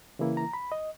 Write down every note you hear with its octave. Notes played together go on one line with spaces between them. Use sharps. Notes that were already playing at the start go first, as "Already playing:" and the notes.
C#3 E3 A#3 E4
A#5
B5
D#5